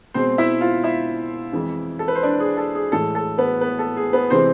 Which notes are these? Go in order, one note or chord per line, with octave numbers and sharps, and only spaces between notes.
B2 G#3 C4 C5
E4 E5
F4 F5
E4 E5
F2 E3 G#3
A4
B4
C5
D4 D5
G#4
A4
G#4
A2 E3 G#3 A4
A4
B3 B4
B3 B4
A4
G#4
B3 B4
C3 E3 G#3 C4 C5